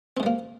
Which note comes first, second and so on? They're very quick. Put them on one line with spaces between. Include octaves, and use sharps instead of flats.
C4 G#2 G3 A#3